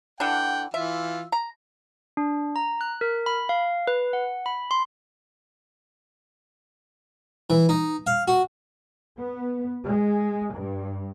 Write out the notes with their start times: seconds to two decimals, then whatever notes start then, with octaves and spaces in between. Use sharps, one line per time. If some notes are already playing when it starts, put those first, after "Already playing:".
0.20 D3 E3 D4 F#5 G5
0.74 E3 F4 E5
1.32 A#5
2.17 D4
2.56 A#5
2.81 F#6
3.01 A#4
3.26 B5
3.49 F5
3.87 B4
4.13 F#5
4.46 B5
4.71 C6
7.50 E3
7.69 D#4
8.07 F5
8.28 F#4
9.18 B3
9.85 G#3
10.53 G2